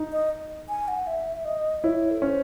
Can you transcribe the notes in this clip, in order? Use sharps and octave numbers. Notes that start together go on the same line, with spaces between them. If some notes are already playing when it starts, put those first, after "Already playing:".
Already playing: D#4
D#5
G#5
F#5
E5
D#5
E4 C#5
A4
C#4 C5